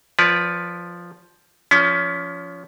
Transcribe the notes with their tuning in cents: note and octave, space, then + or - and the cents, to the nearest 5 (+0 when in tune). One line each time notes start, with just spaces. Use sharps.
F3 +0 B4 +0 D5 -30
F3 +0 C#4 +30